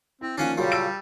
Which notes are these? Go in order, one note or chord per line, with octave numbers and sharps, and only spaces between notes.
C4 E4
D#3 F3 A#3 C#4 D4 F5 F#5
F#2 A#2 C#3 G3
A5 E6 D7